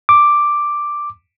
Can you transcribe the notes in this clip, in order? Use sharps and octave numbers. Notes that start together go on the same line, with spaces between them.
D6